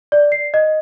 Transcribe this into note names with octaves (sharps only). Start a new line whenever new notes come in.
D5
C7
D#5